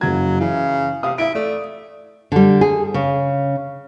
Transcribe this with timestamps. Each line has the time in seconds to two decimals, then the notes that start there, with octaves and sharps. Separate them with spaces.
0.01 F#1 C#3 F#3 G#6
0.40 C#3 E3
1.03 C3 F5 D#6
1.18 E4 E5 D7
1.35 A3 D5
2.32 D3 G3
2.61 G#4
2.94 C#3